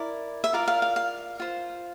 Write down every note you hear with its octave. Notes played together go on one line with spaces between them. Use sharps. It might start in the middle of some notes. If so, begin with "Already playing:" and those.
Already playing: E4 A#4 D5
E5
F4 A#4 D5 F5
F5
F5
F5
F4 C5